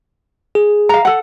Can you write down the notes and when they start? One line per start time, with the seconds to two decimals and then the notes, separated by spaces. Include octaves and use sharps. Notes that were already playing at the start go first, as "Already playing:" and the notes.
0.55 G#4
0.89 F5 A#5
1.05 A4 F#5